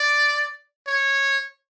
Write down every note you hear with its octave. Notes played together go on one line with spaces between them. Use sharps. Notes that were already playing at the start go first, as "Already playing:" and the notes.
Already playing: D5
C#5